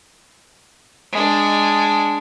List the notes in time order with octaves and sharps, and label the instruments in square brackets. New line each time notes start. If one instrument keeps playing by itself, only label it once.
[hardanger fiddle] G#3 D4